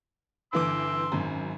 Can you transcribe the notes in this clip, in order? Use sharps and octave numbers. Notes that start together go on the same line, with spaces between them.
G1 E3 C6 D6 E6
G#1 F#2